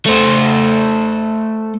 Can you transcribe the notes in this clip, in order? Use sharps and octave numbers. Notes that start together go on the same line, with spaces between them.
A3 C5